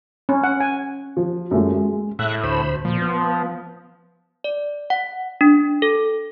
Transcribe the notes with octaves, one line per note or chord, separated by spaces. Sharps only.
C#4
F#5
G#5
F3
F#2 G#3 A3
G#3
A2 E5 F#6
D2 C5 B5
A#2 F3
B3
D5
F#5
D4
A4